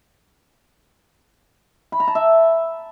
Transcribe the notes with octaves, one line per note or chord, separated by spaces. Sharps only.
B5
A#5
A5
E5